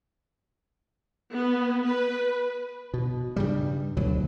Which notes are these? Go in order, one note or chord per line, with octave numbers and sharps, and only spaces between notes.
B3
B4
B2
G2 C#3 G3
D2 B2 F#3